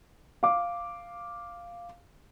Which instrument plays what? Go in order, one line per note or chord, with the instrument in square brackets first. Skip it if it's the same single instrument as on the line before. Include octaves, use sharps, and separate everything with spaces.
[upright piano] F5 D6